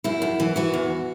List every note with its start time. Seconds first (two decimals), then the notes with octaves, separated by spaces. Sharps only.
0.04 F#2 E4
0.22 F#2
0.40 E3
0.56 E3 F#4
0.73 E2